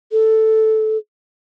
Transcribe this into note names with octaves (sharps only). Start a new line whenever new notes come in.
A4